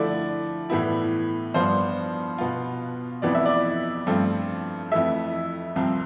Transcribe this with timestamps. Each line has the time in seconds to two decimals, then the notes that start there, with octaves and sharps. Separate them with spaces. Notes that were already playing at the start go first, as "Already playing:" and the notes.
Already playing: D3 F3 A3 E4 D5
0.70 A2 E3 B3 E4
1.54 G2 F3 B3 D4 C5
2.38 B2 B3 F4
3.22 F2 E3 B3 D5
3.35 E5
3.46 D5
4.07 G2 F3 A3 C4
4.91 F2 E3 A3 E5
5.76 C2 C3 F3 C4